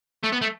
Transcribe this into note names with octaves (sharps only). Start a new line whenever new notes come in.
A3
B3
A3